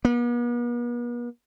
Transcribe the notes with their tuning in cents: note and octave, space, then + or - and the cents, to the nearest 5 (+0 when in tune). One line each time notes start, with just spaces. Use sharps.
B3 -45